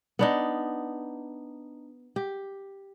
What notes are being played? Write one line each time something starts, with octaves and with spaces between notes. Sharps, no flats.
B3 D4 D#4
G4